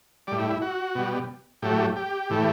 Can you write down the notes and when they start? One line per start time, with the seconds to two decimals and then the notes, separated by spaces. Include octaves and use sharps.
0.27 A2 G3 D5
0.39 E4
0.50 E4
0.62 F#4
0.95 B2 G3
1.62 A2 F#3 A3 G4
1.96 G4
2.30 A2 E3 A3